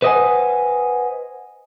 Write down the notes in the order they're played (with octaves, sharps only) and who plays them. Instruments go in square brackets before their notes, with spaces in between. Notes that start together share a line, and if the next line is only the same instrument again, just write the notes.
[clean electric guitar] B4 C5 D#5 E5 F#5 G#5